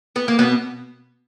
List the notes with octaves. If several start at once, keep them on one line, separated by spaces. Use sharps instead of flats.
B3
A#3
B2 B3